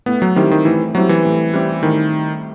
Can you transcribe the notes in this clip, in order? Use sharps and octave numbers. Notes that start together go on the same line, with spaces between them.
A2 B3
F#3
D#3 G3 C4 E4 G4
D#3
A2 E3
F#3 G3 C4 E4 G4
E3
A2
G3 C4 E4 G4
A2 D#3